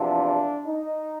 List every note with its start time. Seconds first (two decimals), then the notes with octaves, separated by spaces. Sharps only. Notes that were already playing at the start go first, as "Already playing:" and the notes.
Already playing: E2 C3 F3 D4
0.65 D#4